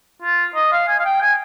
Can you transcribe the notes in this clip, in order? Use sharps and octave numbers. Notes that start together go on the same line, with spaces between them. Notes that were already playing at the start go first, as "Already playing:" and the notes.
F4
D#5
F5
G#5
F5
G5
G#5